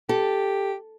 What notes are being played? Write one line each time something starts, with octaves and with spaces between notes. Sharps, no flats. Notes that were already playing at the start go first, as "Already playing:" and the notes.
G4 A4